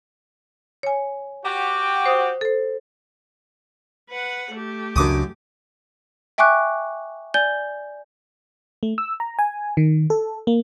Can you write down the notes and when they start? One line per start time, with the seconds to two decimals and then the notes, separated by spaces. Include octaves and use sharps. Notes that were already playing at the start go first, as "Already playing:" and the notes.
0.83 C#5 G#5
1.44 F#4 G4 G5
2.05 C5 D#6
2.41 A4 C5
4.10 B4 F#5
4.52 A3 G4
4.96 C#2 F#2 C#3 D4 D6 D#6
6.38 E5 G5 G#5 C#6 D6 F#6
7.34 D5 G#5 G6 G7
8.83 A3
8.98 E6
9.20 A#5
9.39 G#5
9.77 D#3
10.10 A4
10.47 A#3